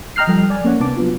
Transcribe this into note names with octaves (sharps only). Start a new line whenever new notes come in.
D#5 G5 A#5 F6 F#6 C7
F3 G3 A4 G5
D5 G#5
A#3 C#4 C#5 F#5
C3 B3 D4 A5 D6
F#3 B3 F4